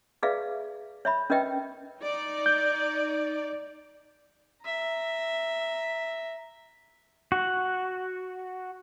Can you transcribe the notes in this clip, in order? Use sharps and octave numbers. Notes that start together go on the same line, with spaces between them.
G#4 B4 D5 E5 F5
C#5 E5 B5
C#4 A#4 B4 D#5 E5 G5
D#4 D5
G6
E5 A#5
F#4